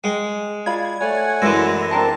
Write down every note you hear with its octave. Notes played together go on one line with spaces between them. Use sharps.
G#3 G5
F4 D5 B5 G#6
A3 C#5 D5 F#5 G#5
F#2 E3 G#3 E6 A#6
C4 D4 A#4 C5 A5 A#5